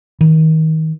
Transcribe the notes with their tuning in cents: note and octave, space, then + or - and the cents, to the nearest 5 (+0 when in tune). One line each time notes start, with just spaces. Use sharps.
D#3 +30